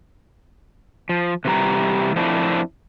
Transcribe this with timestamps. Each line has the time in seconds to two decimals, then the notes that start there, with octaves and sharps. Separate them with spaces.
1.09 F3
1.45 C3 E3 G3 A#5
2.16 F3 A3 C4 D4 E4